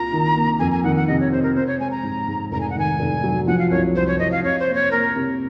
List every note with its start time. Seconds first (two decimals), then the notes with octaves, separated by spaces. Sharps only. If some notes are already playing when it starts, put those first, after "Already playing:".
Already playing: C2 A#2 A#3 F4 A#5
0.12 D#3
0.35 A#3
0.59 F2 G#5
0.71 G#5
0.84 D#3 F#5
0.96 F#5
1.08 C3 D#5
1.20 C#5
1.31 C3 C5
1.43 A#4
1.55 C4 C5
1.67 C#5
1.79 G#3 G#5
1.91 A#5
2.03 G#2
2.28 G#2
2.51 F1 A#5
2.60 G#5
2.70 F#5
2.75 D#3 G#5
2.99 F1
3.24 F#3
3.47 F3 F#5
3.59 F5
3.71 C2 C#5
3.96 C2 C5
4.07 C#5
4.19 C2 D#5
4.32 F5
4.43 C3 C#5
4.60 C5
4.68 A#3
4.75 C#5
4.91 A#3 A#4
5.16 C3